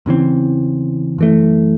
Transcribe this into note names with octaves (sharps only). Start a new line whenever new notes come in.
E2 C#3 E3 C4
F#2 E3 A3